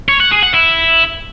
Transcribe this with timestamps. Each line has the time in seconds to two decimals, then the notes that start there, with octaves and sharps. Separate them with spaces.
0.09 C#5
0.20 F#5
0.32 G#4
0.43 F#5
0.54 E4